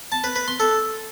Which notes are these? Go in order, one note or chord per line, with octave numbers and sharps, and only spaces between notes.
A5
B4
B4
C6
A4